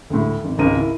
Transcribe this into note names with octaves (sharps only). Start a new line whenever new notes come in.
D2 A2
G#1
G#1 C#2 A#4 D#7
E4